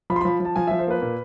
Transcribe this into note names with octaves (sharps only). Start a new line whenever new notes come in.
F3 B5
C6
F3 B5
F3 A5
F3 G#5
F3 E5
C5
A#3 B4
A#2